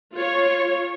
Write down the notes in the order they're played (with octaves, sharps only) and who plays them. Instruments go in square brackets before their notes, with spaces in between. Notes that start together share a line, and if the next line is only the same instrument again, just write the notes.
[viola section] F4 C#5